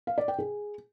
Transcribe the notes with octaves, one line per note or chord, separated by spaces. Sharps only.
F5
D5
G5
G#4